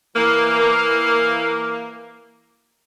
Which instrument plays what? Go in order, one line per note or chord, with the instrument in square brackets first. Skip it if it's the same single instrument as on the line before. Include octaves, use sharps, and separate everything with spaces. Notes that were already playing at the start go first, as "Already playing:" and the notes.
[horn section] E3 A#3